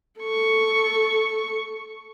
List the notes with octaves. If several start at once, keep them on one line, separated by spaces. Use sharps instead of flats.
A4 C#6